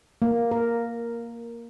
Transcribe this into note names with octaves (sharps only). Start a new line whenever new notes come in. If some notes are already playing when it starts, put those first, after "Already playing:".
A#3
A#4